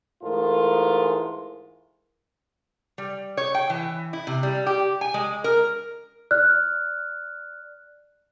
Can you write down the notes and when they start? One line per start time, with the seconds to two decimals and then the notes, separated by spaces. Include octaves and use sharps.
0.24 G#2 E3 A3 F4 A#4
2.98 G3
3.37 C#5
3.55 G5
3.70 E3
4.13 E4
4.27 C3
4.43 G3
4.66 G4
5.01 G#5
5.14 G#3
5.44 A#4
6.31 D5 F6 F#6